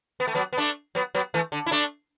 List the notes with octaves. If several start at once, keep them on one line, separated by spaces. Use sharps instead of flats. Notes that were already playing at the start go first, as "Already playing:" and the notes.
B3
A3
F#3 B3
B3
A3 D4
F#3 B3
F#3 B3
E3 A3
D3
E4
A3 D4